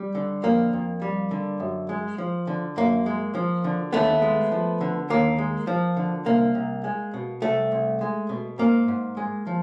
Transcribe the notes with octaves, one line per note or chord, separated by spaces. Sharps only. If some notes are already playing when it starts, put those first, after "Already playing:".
Already playing: G3
D3
F2 A#3
F2
G3
D3
F#2
G#3
F3
D3
F#2 A#3
G#3
F3
D3
D#2 A3 B3
G#3
F3
D3
D#2 A#3
G#3
F3
D3
C2 A#3
C2
G#3
B2
C2 A3
C2
G#3
B2
G#2 A#3
G#2
G#3
F3